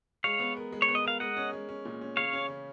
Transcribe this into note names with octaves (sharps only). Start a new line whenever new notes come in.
G#3 C#5 F5
B3
A#4
G#3
C#5
B3
D#5
A#4 F5
G#3 D#5 F#5
C#4
G#3
C#4
A#2
C#4
C#3 C#5 F5
C#4
C#3